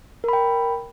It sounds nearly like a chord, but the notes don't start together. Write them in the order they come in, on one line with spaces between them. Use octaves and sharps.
A#4 B5 G5